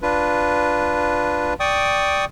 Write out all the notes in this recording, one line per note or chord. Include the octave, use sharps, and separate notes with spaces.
D4 F4 B4
D5 G5 C#6 D#6